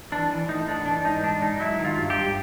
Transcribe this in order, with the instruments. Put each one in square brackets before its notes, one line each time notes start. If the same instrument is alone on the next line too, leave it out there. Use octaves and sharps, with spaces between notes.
[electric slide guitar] E3 D4
E3
A2 D#4
A2 D4
E3 D4
G#2 D#4
G#3 D4
G#2 D#4
F#3 E4
D#3
F4
G2
G4
G2